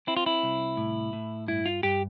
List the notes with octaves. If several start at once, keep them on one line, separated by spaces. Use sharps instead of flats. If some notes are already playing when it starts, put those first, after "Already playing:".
C4 E4
F4
E4
C2
A2
A2
G2 E4
F4
G2 G4